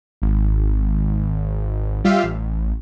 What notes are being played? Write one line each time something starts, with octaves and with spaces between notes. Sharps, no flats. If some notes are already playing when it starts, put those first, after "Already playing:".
G#1
G3 F4 G4 E5 F5
A1